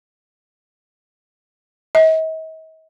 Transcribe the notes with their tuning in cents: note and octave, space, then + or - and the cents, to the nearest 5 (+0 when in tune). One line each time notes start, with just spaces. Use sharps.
D#5 +45